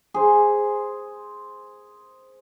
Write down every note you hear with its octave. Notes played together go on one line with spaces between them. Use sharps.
G#4 C5